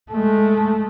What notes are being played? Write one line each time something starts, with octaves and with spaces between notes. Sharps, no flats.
G#3 A3